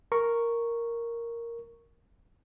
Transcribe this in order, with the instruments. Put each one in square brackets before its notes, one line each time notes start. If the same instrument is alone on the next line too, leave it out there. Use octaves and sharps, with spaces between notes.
[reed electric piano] A#4 C#6